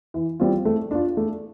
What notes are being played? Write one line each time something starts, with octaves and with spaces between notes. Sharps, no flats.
E3
G3 C4 F4
A3
D4 F4
A3